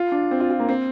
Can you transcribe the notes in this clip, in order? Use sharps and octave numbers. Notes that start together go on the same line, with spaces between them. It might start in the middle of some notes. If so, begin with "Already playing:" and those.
Already playing: F4
D4
C4
F4
F4
A#3
C4